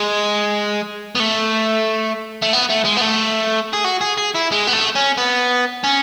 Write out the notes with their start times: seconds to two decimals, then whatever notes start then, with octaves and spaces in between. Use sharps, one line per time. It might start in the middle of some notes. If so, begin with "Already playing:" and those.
Already playing: G#3
1.15 B3
1.20 A3
2.42 A3
2.53 B3
2.70 A3
2.85 G#3
2.97 B3
3.02 A3
3.73 G#4
3.85 F#4
4.01 G#4
4.17 G#4
4.34 E4
4.52 G#3
4.67 B3
4.73 A3
4.96 C#4
5.17 B3
5.84 C#4